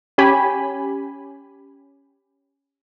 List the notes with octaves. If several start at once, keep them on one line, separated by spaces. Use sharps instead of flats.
C#4 G4 G#5 B5